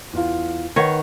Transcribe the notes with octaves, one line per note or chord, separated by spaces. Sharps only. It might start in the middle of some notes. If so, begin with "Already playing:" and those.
E2 F4 F5
D#3 B4 C#5 F#5